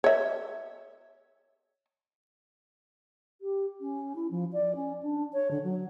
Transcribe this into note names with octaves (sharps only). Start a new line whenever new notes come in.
C#5 E5
G4
C#4
E4
F3
D5
C#4
D4
C#5
D3
F#3